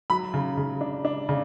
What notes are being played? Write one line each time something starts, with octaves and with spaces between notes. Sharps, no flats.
F#3 B5
C#3
C#3
D4
D4
C#3